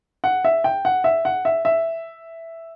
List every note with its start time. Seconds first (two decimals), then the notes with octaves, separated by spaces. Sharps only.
0.24 F#5
0.45 E5
0.64 G5
0.85 F#5
1.04 E5
1.25 F#5
1.45 E5
1.65 E5